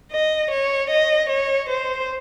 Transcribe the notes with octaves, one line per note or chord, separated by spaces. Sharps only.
D#5
C#5
D#5
C#5
C5